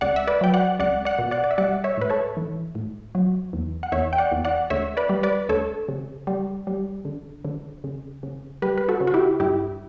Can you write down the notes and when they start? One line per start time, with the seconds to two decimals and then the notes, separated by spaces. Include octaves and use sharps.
0.01 C#2 D5 F#5
0.16 E5
0.27 B4 D5
0.41 F#3 G5
0.54 D5 F#5
0.79 C#2 D5 F#5
1.05 D5 F#5
1.19 B2
1.31 D5 F#5
1.44 D5
1.51 E5
1.58 G3 D5 F#5
1.84 C#5 E5
1.97 A2 B4
2.10 A4 C#5
2.37 E3
2.75 A2
3.15 F#3
3.53 E2
3.83 F#5
3.92 E2 C#5 E5
4.13 G5
4.18 D5 F#5
4.32 E2
4.45 D5 F#5
4.70 D2 C#5 E5
4.97 B4 D5
5.09 G3
5.23 B4 D5
5.49 D2 A4 C#5
5.88 C#3
6.27 G3
6.67 G3
7.05 D3
7.45 D3
7.84 C#3
8.23 C#3
8.62 G3 G4 B4
8.78 B4
8.89 F#4 A4
9.00 C#3
9.07 F#4
9.14 E4 G4
9.40 G2 E4 G4